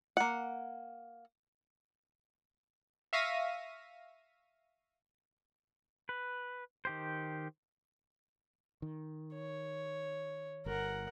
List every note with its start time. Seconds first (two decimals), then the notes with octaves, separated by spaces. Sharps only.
0.17 A#3 F#5
3.13 E5 F5 C#6 A#6 B6 D#7
6.09 B4
6.85 D#3 G4 C5
8.82 D#3
9.34 C#5
10.66 G1 A#4 F#5